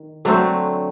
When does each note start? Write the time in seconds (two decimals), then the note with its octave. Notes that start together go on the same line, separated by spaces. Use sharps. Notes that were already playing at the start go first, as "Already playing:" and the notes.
Already playing: D#3
0.25 D3 F#3 A3 C4